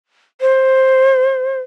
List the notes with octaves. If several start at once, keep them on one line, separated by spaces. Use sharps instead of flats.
C5